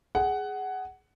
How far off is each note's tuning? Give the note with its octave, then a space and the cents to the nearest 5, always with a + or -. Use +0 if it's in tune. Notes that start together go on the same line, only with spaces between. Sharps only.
G#4 +0 F#5 +15